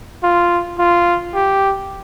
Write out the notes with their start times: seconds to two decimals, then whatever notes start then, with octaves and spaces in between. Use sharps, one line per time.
0.23 F4
0.78 F4
1.35 G4